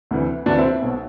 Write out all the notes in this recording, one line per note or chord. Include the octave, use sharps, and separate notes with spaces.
D2 C3 E3
D2 C3 E3 D4 F#4
C4 E4
B1 B2